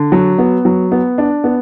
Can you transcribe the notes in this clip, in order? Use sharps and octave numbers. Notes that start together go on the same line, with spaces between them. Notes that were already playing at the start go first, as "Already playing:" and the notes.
Already playing: D3
F#3
B3
F#3
B3
D4
B3